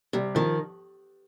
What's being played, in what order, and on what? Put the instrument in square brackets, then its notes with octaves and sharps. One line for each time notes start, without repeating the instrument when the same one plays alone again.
[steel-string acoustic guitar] C3 [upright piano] G3
[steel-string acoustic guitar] D#3 [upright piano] F3